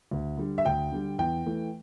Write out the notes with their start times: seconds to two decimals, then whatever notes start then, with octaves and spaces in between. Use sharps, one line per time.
0.11 D2
0.37 D3 G3
0.58 E5
0.65 D2 G5
0.92 D3 G3
1.19 E2 G5
1.46 E3 A3